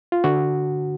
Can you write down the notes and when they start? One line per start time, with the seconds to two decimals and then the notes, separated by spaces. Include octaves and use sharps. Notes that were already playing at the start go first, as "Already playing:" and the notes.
0.12 F4
0.24 D3 F#4